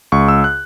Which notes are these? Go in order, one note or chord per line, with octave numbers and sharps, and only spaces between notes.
C#2 C#6
E6
F#6